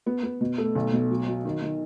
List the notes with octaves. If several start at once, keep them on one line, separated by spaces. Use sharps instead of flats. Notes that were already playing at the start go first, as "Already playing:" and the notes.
B3
B3
B2
A3
B1
B2
F#3
F#3
D#3
D#3